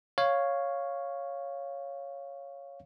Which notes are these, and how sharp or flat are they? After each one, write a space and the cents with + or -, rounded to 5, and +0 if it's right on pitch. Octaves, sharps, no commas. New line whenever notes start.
C#5 +0 F5 +0